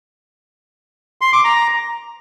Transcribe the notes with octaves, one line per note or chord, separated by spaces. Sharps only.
C6
D6
A#5